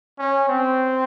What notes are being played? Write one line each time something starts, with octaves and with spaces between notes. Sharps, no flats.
C#4
C4